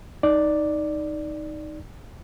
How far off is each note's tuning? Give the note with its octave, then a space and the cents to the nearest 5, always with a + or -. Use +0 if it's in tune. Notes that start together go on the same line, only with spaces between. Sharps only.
D#4 +0 D5 +0